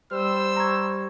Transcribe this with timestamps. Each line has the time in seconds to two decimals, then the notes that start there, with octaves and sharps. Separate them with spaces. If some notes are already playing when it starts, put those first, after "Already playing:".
0.12 G3 C5 E6
0.57 A#5 C#6 G#6